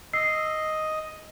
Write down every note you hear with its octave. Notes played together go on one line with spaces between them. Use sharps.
D#5 E6 C7